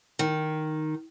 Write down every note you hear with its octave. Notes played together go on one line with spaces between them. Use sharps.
D#3